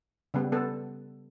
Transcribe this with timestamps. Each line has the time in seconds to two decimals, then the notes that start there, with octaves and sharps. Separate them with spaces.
0.34 C#3 G3 B3
0.52 B3 A4